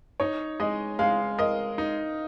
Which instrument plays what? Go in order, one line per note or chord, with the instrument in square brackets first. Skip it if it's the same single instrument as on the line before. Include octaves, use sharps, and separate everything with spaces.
[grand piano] D#4 [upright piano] C#5
[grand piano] G#3 [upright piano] D#5
[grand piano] G#3 [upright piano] F5
[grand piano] A#4 [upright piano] D#5
[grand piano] D#4